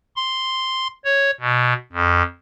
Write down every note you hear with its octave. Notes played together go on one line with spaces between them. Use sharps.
C6
C#5
B2
F2